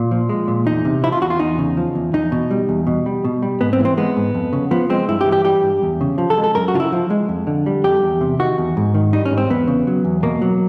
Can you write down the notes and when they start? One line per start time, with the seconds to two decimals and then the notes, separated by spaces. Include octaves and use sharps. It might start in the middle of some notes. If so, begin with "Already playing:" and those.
Already playing: A#2
0.11 F3
0.29 G#3
0.48 A#2
0.66 E2 D#4
0.85 C3
1.04 F3 E4
1.12 F4
1.21 E2 F#4
1.30 F4
1.39 E2 D#4
1.58 C#3
1.77 F3
1.95 E2
2.13 E2 D#4
2.32 B2
2.51 G3
2.69 E2
2.87 B2
3.06 G3
3.25 B2
3.42 G3
3.61 G#2 B3
3.73 C4
3.80 E3
3.85 C4
3.97 G#3 B3
4.17 G#2
4.35 F2
4.53 C#3
4.71 F3 B3
4.90 G#3 C4
5.09 G2 E4
5.21 G4
5.26 E3
5.32 G4
5.45 G3 G4
5.63 G2
5.82 E2
6.01 C#3
6.18 F3
6.30 A4
6.38 G#3
6.44 A4
6.55 F#2 A#4
6.68 F#4
6.74 C#3 F4
6.80 E4
6.92 F3
7.10 G#3
7.29 F2
7.47 D3
7.66 G3
7.84 F2 G4
8.03 E2
8.21 C3
8.39 D#3 F#4
8.58 E2
8.77 G#2
8.94 D#3
9.13 G3 D#4
9.25 C#4
9.31 G#2
9.38 C4
9.50 E2 B3
9.68 C#3
9.87 F#3
10.05 E2
10.23 B2 A#3
10.42 F#3